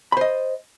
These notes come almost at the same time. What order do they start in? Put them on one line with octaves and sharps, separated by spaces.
B5 C5 D#5